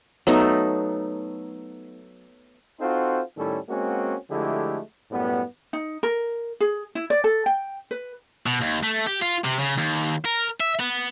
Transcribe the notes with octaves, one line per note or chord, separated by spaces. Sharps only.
F#3 A3 B3 D#4
C4 D#4 F4 F#4 A4 C5
A2 D#3 G3 C#4 E4 A4
G#3 A#3 C4 C#4 F#4
D3 F3 G#3 A3 E4 G4
F#2 A2 G3 B3
D#4
A#4
G#4
E4
D5
A4
G5
B4
B2
D#2
A3
G4
F4
C3
C#3
D#2
A#4
E5
B3